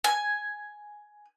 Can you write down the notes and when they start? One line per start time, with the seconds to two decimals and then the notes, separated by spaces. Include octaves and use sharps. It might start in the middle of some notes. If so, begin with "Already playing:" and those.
0.04 G#5